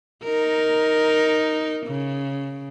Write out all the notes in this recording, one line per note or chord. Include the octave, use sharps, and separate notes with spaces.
D#4 A#4
C#3